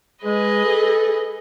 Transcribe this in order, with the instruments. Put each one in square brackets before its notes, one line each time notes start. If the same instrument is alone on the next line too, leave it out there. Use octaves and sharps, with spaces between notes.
[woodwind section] G#3 [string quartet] G#4 B4 D#5
[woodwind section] A4